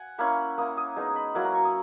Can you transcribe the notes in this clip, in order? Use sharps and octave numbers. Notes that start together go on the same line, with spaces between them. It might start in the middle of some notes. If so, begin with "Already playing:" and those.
Already playing: F#5 G#5
A#3 C#4 E4 B5
A#3 E4 D#6
D#6
G#3 B3 D#4
B5
F#3 A#3 C#4 E4 F#5
A#5
C#6
D#6